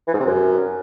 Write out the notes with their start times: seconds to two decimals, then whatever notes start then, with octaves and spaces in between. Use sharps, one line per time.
0.08 E3
0.14 G#2
0.20 C3
0.26 F#2